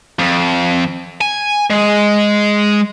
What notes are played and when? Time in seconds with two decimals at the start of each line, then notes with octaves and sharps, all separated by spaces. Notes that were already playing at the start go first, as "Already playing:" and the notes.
0.19 F2
1.21 G#5
1.70 G#3